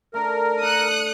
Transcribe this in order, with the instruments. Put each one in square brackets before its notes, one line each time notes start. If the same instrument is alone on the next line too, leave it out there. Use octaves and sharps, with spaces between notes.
[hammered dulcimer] A3 D4 [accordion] A#4
[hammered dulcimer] A4 [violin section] D#6 F#6 C#7